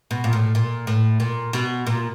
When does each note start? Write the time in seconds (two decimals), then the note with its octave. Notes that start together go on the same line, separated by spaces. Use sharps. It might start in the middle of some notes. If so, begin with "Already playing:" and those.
0.11 B2
0.24 A#2
0.33 A2
0.55 A#2
0.87 A2
1.20 A#2
1.53 B2
1.87 A#2